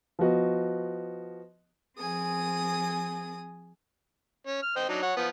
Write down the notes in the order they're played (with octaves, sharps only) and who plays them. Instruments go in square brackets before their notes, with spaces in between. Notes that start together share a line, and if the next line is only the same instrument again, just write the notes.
[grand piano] F3 B3 F#4 D#5
[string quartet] F3 C4 G#4 G#5 D#6
[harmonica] C#4
F6
C5 D#5 G5
F#3 D4 D#4
C#5 F#5
F3 B3